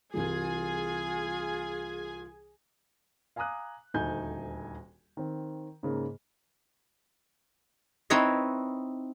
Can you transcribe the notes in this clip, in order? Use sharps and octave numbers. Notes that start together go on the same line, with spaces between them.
C2 E3 G3 F4 G#4 G#5
F5 G#5 A#5 D6 D#6 F#6
D#1 D2 D#4 G#5 G6
D#3 C4
G#2 C#3 A#3
C4 D#4 E4 B4 C#5 D#5